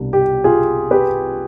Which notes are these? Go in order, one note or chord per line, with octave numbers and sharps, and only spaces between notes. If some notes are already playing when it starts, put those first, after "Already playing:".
Already playing: C2 B2 G3 D4
G4
F4 G#4
G4 B4